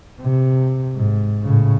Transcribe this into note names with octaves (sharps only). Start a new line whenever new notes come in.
C3
G#2
A2 C#3